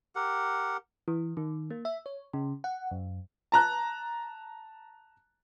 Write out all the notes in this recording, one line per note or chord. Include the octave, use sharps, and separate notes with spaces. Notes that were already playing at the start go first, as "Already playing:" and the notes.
G4 A#4 F#5
E3
D#3
A#3
E5
C#5
C#3
F#5
F#2
A5 A#5 F#6